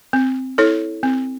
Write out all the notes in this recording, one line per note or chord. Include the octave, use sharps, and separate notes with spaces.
C4
E4 A4 C#5
C4